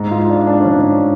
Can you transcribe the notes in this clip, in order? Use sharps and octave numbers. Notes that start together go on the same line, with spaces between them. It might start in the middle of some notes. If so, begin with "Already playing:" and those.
Already playing: G#2
F4
D4
D4
C#4
G#2
D4